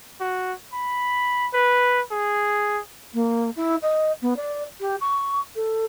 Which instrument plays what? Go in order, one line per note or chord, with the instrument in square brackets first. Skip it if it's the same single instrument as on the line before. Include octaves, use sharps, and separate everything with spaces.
[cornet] F#4
B5
B4
G#4
[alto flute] A#3
E4
D#5
B3
D5
G4
C#6
A4